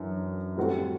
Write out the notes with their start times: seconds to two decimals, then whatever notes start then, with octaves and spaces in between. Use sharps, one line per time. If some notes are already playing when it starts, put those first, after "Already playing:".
Already playing: F#2 E3 D4
0.57 A2 G3 C4 F#4 A4